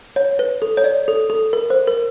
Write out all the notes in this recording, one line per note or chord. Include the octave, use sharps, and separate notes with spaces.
C#5
B4
A4
C#5
D5
A4
A4
A#4
C5
A#4